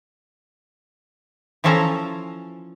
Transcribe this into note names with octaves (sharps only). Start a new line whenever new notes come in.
E3 F3 C#4 A4 G#5 A#5